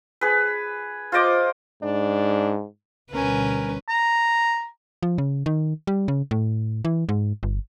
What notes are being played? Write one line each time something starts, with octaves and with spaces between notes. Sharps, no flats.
G#4 B4
F4 C5 D#5 D6
G#2 D4
D2 B2 G3 C#4 A#4 B4 G#5
A#5
F3
C#3
D#3
G3
C#3
A2
E3
G#2
G1